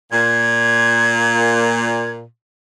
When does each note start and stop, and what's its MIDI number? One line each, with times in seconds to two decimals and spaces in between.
0.12 2.24 46
0.12 2.11 92